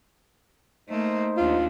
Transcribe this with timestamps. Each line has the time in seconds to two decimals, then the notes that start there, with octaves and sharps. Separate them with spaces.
0.89 A3 A#3 D#4 C5
1.37 D#2 D4 F4